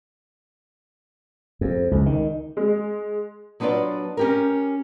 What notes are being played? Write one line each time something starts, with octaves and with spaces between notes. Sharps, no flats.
F2
C#2
D#3
G#3
F#3 B3 D4 F4 B4 D5
C#4 G4 A#4